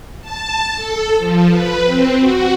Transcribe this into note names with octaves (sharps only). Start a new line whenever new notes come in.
A5
A4
F3
B4
C4
F#4